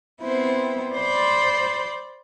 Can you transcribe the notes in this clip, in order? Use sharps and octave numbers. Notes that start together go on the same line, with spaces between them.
B3 C4 E4 C5
C5 D5 B5 C6